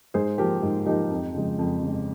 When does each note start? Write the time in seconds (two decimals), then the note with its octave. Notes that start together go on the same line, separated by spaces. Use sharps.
0.14 G#2 G#4 C5
0.38 F3 A#3 G4 A#4
0.63 G#2
0.86 F3 A#3 D#4 G4
1.10 F2
1.34 C#3 F3 G#3
1.58 F2
1.83 C#3 F3 G#3